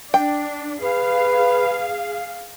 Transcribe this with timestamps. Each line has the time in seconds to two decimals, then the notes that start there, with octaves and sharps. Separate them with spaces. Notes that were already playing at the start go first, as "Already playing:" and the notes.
0.14 D4 G5
0.82 G#4 B4 F5